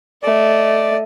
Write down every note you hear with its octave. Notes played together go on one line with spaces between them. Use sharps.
A3 D5 D#5